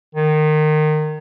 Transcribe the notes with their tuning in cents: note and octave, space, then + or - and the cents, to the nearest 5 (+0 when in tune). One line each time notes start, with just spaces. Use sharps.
D#3 -25